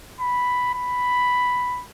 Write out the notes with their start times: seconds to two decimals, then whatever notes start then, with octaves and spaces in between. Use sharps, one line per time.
0.20 B5
0.74 B5